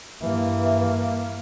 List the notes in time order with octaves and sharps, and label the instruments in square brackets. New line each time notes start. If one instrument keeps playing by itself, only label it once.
[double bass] G2 E3 [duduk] A#3